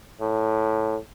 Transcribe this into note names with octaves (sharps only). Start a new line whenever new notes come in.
A2